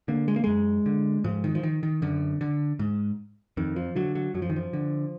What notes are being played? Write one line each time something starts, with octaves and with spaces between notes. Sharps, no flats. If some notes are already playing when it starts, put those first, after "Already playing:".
D3 A#3
G#3
A#3
F#2 G#3
D3
G#2 F3
D#3
F3
D#3
D#3
F#2 D3
D3
G#2
F2 D#3
F3
D3 F#3
F#3
F#2 F#3
F3
D#3
F3
D3